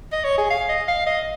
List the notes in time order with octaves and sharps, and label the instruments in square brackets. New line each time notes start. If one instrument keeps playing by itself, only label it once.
[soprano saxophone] D#5
C#5
G#4
F5
D#5
F5
D#5